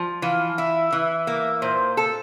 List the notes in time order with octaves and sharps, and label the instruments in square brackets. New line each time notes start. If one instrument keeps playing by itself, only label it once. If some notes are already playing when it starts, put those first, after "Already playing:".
Already playing: [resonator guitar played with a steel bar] F3
[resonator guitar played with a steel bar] E3 [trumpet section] F5
[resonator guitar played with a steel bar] E4 [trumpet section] E5
[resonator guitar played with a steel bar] E3 [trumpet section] E5
[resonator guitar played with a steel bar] A#3
[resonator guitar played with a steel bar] A#2 [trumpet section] C5
[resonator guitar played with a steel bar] A4